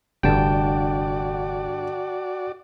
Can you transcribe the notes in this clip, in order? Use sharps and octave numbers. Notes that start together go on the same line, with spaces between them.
F1 G2 D3 F#4 D5 G5 A5